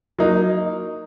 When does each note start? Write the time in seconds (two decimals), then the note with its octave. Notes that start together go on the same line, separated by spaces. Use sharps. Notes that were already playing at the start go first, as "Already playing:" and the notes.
0.18 F#3 A#3 D#4